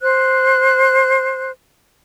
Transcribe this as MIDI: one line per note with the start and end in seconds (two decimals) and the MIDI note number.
0.02 1.50 72
0.02 1.50 90